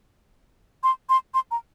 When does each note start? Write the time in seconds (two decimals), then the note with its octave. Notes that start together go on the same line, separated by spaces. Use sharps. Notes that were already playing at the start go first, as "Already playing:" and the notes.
0.83 C6
1.09 C6
1.34 C6
1.51 A#5